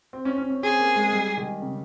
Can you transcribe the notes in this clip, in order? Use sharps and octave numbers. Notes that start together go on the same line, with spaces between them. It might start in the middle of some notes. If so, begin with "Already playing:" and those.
C4
C#4
C#4
C#4
C4 G#4
A#3
G#3
G3
D#3
C#3